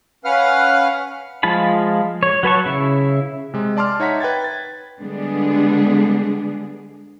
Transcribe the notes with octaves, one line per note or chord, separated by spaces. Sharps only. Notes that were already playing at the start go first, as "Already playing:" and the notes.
C#4 B4 F5 F#5 F6
F3 G#3 F4 A5 B5
C#5
F#3 B4 A5 C#6
C#3 E4
C3 G#3
D5 A5 C6 D6 F6
D#4 C#5 E5 F#5 A#5 B6
B4 G5 G#6 A6
A6
D3 G3 G#3 B3 D4 G#4